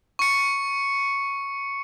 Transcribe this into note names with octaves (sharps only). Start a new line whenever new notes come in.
C#6 C#7